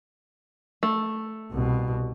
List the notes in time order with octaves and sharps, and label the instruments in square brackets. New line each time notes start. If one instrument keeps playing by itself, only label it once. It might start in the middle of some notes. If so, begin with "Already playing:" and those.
[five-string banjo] A3
[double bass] C2 B2